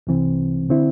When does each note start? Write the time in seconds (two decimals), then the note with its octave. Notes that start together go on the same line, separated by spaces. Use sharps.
0.07 C2 C3 E3 C4
0.70 D3 C4 E4